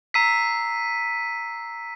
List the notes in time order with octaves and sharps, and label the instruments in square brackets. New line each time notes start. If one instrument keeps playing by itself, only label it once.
[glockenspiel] A#5 E6 C7 [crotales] B6 D#7